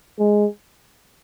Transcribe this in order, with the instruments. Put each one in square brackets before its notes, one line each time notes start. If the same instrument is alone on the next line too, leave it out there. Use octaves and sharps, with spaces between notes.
[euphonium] G#3